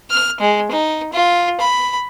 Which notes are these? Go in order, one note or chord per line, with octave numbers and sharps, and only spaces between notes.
F6
G#3
D#4
F4
B5